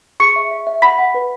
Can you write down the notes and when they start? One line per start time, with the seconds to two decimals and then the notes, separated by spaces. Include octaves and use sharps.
0.20 G#4 C#6 C#7
0.36 E5
0.51 E5
0.67 E5
0.82 F#5 B5 B6
0.98 F#5
1.14 B4